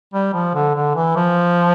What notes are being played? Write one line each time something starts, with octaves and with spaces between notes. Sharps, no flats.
G3
F3
D3
D3
E3
F3